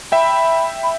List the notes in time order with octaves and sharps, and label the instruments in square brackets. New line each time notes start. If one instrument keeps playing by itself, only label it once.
[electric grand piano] E5 G5 [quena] B5
[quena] B5